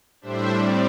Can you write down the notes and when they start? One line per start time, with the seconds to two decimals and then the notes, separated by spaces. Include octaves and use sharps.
0.21 A2 G3 D4 C5 E5
0.51 A2 G3 C4 D5